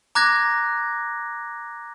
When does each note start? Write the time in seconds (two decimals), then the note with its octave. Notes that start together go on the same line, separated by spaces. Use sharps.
0.15 A#5 D6 F#6 G#6 A#6